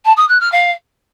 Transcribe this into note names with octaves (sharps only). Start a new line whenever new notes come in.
A5
D#6
F#6
F6
F5